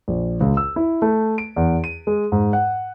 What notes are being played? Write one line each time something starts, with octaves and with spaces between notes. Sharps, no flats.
A#1
C#2
E6
E4
A3
D7
E2
D#7
G#3
G#2
F#5